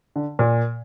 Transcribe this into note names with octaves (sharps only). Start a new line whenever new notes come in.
D3
A#2